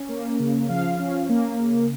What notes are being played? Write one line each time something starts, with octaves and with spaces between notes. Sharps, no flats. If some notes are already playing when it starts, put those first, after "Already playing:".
Already playing: C#4
A#3
C#3
F3 F5
C#4
A#3
C#3